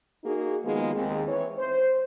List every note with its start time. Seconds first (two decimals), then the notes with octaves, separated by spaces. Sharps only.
0.24 A#3 D#4 F#4 G#4
0.64 D#3 F3 G#3 A#3 B3
0.95 D#2 D#3 G#3 C4
1.27 E3 C#5
1.58 C5